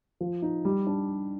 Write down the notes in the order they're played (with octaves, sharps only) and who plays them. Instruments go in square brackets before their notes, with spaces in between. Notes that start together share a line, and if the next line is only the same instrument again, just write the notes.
[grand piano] F3
D#4
G3
D4